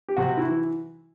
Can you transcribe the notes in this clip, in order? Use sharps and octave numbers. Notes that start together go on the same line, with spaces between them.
G4
C3 F#4
E4
E3